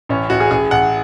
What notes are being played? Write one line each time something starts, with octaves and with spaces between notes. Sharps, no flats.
A1 C#4
A1 F#4
G#4
A1 G#4
A1 F#5